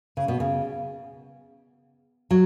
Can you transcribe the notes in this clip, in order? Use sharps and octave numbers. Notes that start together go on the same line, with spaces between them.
C#3
B2
C#3
F#3